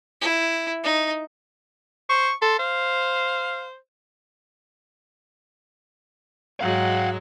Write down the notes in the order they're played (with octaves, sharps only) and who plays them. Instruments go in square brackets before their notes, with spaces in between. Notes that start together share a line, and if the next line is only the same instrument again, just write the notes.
[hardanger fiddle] E4
D#4
[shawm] C5 [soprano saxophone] C#6
[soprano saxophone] A4 [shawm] C6
[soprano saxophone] C5 [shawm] F5
[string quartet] G#2 F#3 G#3 [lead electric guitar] F5 F#5